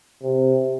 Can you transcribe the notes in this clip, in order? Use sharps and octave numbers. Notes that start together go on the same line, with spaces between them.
C3